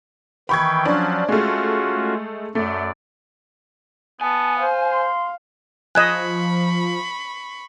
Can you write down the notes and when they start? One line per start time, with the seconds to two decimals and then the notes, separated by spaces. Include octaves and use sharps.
0.49 D#3 E3 G5 B5 C#6 G#6
0.86 F3 F#3 C#4 D4
1.29 G#3 A3 C#4 F4 F#4
2.55 F#2 A3 D5
4.21 B3 G#5 A5
4.59 C5 F5
4.91 C6
5.95 F3 D#5 G#5 B5 C#6 F#6 G#6 E7